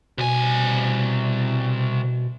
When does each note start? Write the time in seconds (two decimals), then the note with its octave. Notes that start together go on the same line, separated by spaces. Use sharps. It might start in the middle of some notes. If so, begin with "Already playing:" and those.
0.18 C2 B2 G#5